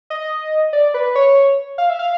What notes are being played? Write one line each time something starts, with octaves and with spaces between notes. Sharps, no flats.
D#5
D5
B4
C#5
F5
E5
F5